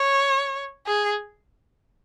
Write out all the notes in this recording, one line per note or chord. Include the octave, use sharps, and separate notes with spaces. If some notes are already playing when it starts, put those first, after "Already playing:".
Already playing: C#5
G#4